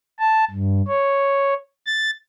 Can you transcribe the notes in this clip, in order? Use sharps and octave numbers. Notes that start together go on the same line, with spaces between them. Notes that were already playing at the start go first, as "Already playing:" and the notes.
A5
G2
C#5
A6